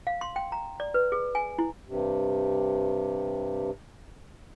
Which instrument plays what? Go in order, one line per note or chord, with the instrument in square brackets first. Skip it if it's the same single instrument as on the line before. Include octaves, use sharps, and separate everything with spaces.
[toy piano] F5
C6
G5
A#5
D5
B4
G#4
G#5
E4
[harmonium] G2 C3